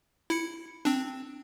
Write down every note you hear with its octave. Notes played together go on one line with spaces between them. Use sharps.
E4 C#7
C4 D4